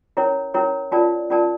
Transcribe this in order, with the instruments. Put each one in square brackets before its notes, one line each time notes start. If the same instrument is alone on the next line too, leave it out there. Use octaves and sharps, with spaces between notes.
[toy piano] C#4 E4 A#4 C#5
C#4 E4 A#4 C#5
C#4 F4 A#4 D5 A5
C#4 F4 A#4 D5 A5